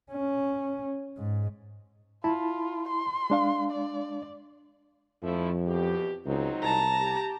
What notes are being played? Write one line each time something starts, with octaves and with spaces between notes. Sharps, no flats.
C#4
G#2
E4 F4 A5 B5
C6
G#3 D4 F5
D5
F2 F3 A3 E4
E2 B2 G4
C#2 F#3 C4 D#4
C2 A5 A#5
G4